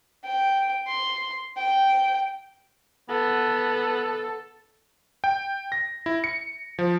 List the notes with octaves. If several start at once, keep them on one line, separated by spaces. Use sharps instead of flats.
G5
C6
G5
B3 A4
G5
A#6
E4
C#7
F3